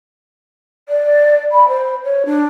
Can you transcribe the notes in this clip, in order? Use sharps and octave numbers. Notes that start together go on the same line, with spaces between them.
D5
B5
C5
C#5
D4